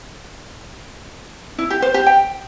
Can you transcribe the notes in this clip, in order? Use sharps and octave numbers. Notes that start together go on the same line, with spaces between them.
E4
G4
C5
G4
G5